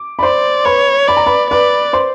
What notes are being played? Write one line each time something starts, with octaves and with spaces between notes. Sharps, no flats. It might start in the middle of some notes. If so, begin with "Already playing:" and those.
Already playing: D6
B5
C5 D5 C6
B4 C#5 B5
D5 B5
A#5
B4 B5
B4 D5 B5
C5 C6